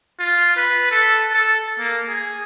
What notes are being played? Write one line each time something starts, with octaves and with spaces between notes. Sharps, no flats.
F4
B4
A4
A4
A#3
G#4